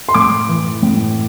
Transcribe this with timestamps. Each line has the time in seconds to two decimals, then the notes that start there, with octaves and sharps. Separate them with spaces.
0.09 C6
0.14 A2 D6
0.49 E3
0.82 A2